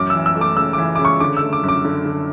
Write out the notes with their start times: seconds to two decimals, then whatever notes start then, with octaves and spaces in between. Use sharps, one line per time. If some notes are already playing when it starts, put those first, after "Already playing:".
Already playing: A1 F#2 D6
0.10 E3 E6
0.26 E6
0.36 A3
0.41 D6
0.57 C#3 E6
0.73 E3 D6
0.96 C#3 D6
1.05 C#6
1.20 D3 D6
1.37 E6
1.42 A3
1.53 D6
1.63 F#2
1.69 D6
1.85 D3
2.06 D3